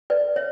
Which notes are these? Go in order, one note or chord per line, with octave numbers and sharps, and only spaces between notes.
B4 D5
C#5 E5